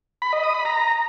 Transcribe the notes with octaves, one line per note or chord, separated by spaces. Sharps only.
B5
D#5
D#6
B5
A#5